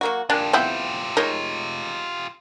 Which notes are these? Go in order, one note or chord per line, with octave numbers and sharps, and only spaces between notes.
F#3 A#3 F#4
A#3 D4 F4 G4 G#5 A5
B3 C4 E4 E5 F#5 G5
G#3 D#4 A#4 C#5